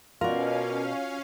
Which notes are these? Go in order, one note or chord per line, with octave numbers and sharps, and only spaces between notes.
B2 C#4 F4 F#4 A#4 D5 F5